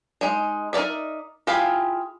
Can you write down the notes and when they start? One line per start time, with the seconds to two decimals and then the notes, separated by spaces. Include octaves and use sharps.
0.21 G#3 D#4
0.73 D#4 A#4 C#5 D5 E5
1.47 E4 F4 G4 G#4 F5